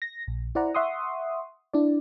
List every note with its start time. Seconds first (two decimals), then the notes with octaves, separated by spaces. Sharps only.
0.02 A#6
0.28 A#1
0.55 E4 C5 D5 F#5 A#5
0.75 E5 F#5 C6 C#6 D#6
1.74 D4 E4 D5